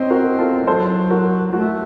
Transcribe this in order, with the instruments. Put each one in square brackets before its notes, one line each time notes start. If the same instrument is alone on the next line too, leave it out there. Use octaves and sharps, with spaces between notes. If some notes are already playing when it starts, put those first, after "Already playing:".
Already playing: [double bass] C4 [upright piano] C5 C#5 D#5
[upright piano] F#4 A#4
F4 A4
[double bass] F#3 [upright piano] A4 C5
[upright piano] F#4 A#4
[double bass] A3 [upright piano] F#4